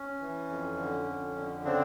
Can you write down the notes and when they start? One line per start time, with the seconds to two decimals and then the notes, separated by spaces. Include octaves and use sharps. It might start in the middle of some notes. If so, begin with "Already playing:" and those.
Already playing: C#4
0.21 E3
0.50 F2
0.79 D3
1.07 F2
1.36 D3
1.64 C#3 C4 D4